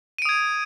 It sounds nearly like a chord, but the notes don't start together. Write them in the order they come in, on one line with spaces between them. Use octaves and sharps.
D#7 D7 D#6 G#6